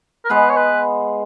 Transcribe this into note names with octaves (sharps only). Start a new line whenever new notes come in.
A#4
G#3 B3 B4
C#5
B4